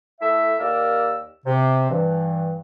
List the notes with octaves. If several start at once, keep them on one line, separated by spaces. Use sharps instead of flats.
A3 E4 A4 E5
D#2 A#3 G4 A#4 D5 E6
C3
G2 E3